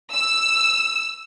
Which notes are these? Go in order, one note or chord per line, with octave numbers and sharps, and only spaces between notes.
E6